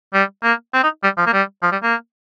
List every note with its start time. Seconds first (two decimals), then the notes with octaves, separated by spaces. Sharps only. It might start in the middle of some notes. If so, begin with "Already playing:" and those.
0.14 G3
0.43 A#3
0.74 C4
0.83 D#4
1.04 G3
1.18 F3
1.27 A#3
1.33 G3
1.63 F3
1.72 G3
1.83 A#3